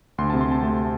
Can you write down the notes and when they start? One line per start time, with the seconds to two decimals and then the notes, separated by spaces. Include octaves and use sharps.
0.18 D2 C6
0.30 A5
0.33 C3
0.41 C6
0.48 C4 A5
0.63 A3 A5